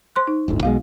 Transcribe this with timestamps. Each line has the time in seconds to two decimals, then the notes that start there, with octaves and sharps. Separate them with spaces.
0.16 C5 C6 F#6
0.27 D#4
0.48 D1 G1 D2
0.63 B1 B2 G#3 F5